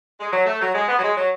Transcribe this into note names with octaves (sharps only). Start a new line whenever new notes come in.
G#3
F#3
A3
F#3
G#3
B3
F#3
G#3
F#3